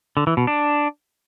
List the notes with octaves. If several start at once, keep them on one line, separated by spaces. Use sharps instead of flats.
D3
E3
B2
D4